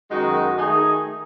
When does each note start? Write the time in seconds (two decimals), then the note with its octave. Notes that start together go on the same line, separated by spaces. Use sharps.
0.10 F#2 D#3 G#3 D#4 F#4
0.55 D#3 A3 D#4 G#4